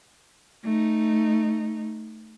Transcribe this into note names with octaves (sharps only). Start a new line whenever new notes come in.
A3 D#4